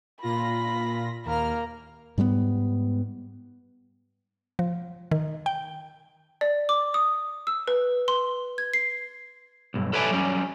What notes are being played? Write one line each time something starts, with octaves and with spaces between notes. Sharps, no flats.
A#2 F4 B5 A#6
D#2 A#3 A#5 F6
G#2 G3 G#3 B3
F3
D#3
G5
D5
D6
D#6
E6
B4
C6
G#6
C7
B1 G2
A4 B4 C#5 D5 E5 G#5
F#3 G3 C#4